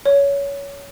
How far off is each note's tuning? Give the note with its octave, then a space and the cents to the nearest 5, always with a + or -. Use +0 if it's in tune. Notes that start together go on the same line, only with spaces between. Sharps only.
C#5 +20